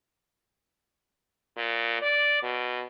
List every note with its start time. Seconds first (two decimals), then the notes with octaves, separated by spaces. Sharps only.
1.57 A#2
2.02 D5
2.43 B2